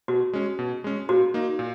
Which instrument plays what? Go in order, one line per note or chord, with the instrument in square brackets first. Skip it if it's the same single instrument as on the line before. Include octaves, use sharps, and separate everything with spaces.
[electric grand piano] B2 [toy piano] F#4
[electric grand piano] G#3 C#4
B2
G#3 C#4
[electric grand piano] A#2 [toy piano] F#4
[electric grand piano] A#3 D#4
A#2